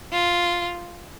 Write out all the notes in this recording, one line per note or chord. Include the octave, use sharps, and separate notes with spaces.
F4